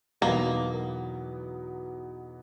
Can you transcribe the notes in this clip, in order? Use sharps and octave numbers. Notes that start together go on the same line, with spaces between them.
E2 B2 F#3 A#3 B3 D#4